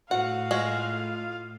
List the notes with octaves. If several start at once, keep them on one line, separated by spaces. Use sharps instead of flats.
A2 F#4 F5 F#5
G#3 F4 F#4